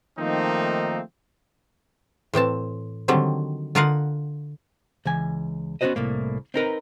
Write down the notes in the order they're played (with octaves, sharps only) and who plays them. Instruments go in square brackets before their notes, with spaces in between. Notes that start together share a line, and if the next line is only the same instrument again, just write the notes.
[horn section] D#3 F3 A3 A#3 C4 D#4
[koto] A2 E3 C4 A5
D3 D#3 F#3 G3 C4
D3 F4 A#4 D#5 F5 F#5
[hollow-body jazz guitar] C#2 E3 G#5
B3 C#4 E4 F#4 C5 D#5
C2 A2 A#3
C4 D#4 A#4 B4